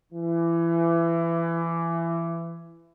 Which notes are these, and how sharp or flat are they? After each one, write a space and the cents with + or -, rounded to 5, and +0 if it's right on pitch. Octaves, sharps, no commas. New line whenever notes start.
E3 +25